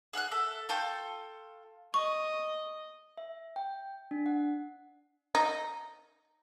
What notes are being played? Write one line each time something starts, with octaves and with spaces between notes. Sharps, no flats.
G#4 F#5 E6 F#6
A4 E5
F4 A4 G5 C#6
D#5 C#6
E5
G5
D4
F#5
D#4